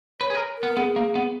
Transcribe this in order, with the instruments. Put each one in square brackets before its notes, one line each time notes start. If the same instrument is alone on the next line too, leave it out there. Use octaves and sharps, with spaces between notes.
[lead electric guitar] B4 [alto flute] C#5
[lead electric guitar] G#4
A#4
[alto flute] A#4
[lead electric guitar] B3
[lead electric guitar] B3 [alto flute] G#4
[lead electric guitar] A#3
B3